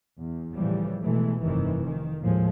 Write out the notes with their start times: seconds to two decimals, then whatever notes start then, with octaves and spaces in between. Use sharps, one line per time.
0.18 E2
0.56 A2 C#3 E3 F3 G3
1.03 B2 E3 G#3 A3
1.43 F1 G2 C3 D#3 E3
1.85 F2 D#3
2.20 D#2 A2 F3 G#3